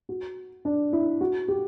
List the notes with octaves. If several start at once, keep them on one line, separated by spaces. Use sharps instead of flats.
F#4
D4
E4
F#4
G4